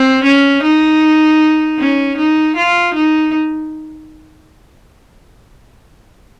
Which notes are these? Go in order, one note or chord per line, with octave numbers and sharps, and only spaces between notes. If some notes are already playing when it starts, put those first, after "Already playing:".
Already playing: C4
C#4
D#4
C#4
D#4
F4
D#4